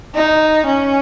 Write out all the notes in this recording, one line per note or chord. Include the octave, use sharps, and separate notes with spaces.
D#4
C#4